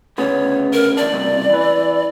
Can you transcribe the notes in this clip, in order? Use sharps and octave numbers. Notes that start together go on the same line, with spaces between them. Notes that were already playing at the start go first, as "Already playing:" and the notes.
D2 C#3 B3 C#5
A#4
E2 D4 D5
C#2 G2 C3
E3 B4